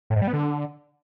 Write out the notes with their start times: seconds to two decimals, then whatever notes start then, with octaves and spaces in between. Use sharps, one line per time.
0.10 A2
0.16 G#2
0.22 G3
0.27 B3
0.33 D3